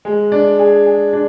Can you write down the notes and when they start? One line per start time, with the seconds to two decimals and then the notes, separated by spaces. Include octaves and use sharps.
0.05 G#3
0.32 D4
0.59 G#4
0.86 G#4
1.13 D4